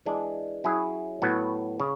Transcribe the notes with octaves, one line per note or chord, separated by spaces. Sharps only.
E3 G#3 D4
F#3 C#4 E4 G#4
A2 F#3 B3 F#4
C#3